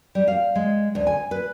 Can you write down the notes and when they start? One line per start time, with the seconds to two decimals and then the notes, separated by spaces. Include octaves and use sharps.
0.15 G3
0.28 F5
0.56 G#3
0.95 D2
1.07 G#5
1.31 B4